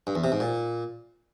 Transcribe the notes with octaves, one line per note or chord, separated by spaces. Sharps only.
G2
E2
C3
G#2
A#2